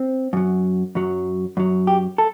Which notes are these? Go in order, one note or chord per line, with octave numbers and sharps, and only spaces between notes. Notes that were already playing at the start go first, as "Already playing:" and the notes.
Already playing: C4
F#2 F#3
F#2 F#3
F#2 F#3
G4
A4